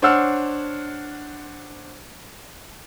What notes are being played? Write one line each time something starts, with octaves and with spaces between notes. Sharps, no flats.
D4 C5 C#5 F#5 E6 F6